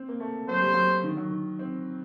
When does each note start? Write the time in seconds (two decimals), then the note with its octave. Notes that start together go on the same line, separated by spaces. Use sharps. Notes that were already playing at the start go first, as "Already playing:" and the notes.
Already playing: C4
0.09 A#3
0.20 A3
0.48 F#3 C5
0.61 G3
0.74 F#3
1.04 D#3
1.17 F#3
1.30 D#3
1.59 C4